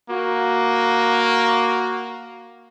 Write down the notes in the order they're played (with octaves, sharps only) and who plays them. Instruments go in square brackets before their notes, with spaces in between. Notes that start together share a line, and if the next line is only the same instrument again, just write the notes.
[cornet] A#3 [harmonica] F#4